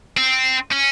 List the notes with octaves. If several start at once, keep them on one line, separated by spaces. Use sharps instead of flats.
C4
C#4